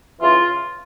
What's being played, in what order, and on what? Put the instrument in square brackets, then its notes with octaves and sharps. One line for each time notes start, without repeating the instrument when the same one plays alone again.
[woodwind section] C#3 E3 F4